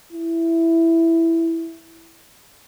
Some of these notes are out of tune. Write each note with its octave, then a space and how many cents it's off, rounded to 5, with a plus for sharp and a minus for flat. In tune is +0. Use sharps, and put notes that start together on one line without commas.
E4 +5